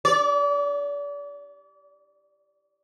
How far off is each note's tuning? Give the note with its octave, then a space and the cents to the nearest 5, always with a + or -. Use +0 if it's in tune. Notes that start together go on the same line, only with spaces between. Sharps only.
D5 -35